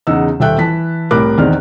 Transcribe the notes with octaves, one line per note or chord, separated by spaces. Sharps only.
E2 C#3 D#4 F#5 E6
D#1 A4 E5 G5 F#6
E3 A5 B6
C2 A2 A#4 B5 D6 F#6
E2 D#3 C4 G#4 D5 F6